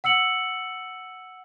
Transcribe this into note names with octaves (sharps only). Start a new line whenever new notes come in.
F#5 E6 C#7 F#7